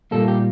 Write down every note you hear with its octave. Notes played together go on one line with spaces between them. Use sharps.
A#2 G3 A#3 A4
G4